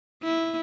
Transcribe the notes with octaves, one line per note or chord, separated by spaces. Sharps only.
E4